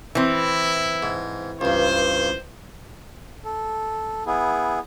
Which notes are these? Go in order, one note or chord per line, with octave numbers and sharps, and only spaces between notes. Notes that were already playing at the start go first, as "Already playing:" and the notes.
E3 C4 E4
G#2
C#2 G2 C5
A4
B3 E4 G#4